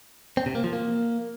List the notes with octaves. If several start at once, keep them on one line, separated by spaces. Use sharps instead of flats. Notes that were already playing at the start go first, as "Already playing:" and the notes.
C4
C3
A#3
F3
A#3